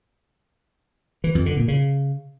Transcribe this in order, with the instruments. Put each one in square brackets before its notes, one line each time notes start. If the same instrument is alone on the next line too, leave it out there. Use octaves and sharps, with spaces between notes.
[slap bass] E3
F2
D3
A#2
C#3